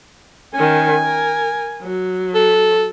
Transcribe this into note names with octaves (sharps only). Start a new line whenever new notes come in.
D#3 C#4 G#5
A#4
F#3
A4